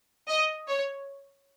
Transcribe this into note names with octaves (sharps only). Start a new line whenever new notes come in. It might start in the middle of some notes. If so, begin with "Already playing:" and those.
D#5
C#5